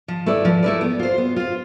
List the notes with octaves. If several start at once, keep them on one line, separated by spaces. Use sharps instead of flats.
F3
A3 E4 B4 D5
F3
A3 E4 B4 D5
B3
F4 C5
B3
F4 C5